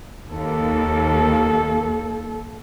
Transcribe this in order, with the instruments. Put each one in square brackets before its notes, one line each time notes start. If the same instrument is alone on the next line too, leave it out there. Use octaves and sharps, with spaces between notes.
[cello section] D#2 [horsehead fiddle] A#3 A4